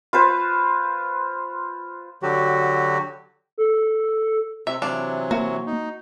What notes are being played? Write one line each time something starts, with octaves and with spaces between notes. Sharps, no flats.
F4 B4 C5
D3 F#3 F#4 G4
A4
C3 E5
C3 E3 F#3 D4 F5
A#3 F#4
D#4